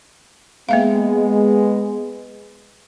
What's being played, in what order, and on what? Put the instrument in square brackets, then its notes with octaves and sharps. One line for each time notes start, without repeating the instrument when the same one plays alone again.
[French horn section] G#3 B3 [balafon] A#3 E5 F5